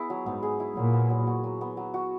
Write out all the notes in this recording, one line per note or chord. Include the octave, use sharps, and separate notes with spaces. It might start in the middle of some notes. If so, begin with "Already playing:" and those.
Already playing: B3 E4 G#4
F#3
G#2 B3
G#4
E4
A#2 F#3
B3
F#3
F#4
F#3
B3
F#3
F#4